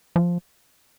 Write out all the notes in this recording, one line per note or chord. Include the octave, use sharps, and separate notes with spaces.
F3